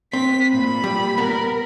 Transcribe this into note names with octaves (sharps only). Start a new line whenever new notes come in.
C4 B6
A#2 B5
G3
B3 A#4